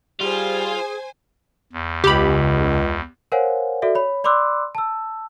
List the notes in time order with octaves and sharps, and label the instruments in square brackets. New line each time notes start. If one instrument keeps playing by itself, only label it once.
[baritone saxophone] G3 [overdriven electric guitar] F4 [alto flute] G#4 [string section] C5 G#5
[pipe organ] E2
[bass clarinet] C#2 [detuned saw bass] C#3 [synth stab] G4 B5
[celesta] A#4 C5 C#5 F5 F#5 G#5
F#4 A4 D5 E5
C#5 B5
D5 B5 C6 D6 E6 F#6
A5 E6